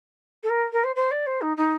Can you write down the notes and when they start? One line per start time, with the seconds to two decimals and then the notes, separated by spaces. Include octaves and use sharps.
0.43 A4
0.49 A#4
0.72 A#4
0.84 C5
0.95 C5
1.11 D5
1.26 C5
1.41 D#4
1.57 D#4